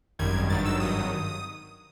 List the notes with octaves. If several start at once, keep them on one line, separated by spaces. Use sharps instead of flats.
G#1 F#2 D#3 G3 G#6
G#1 G2 D#3 F#3 A6
E6
G#1 G2 D#3 F#3 D#6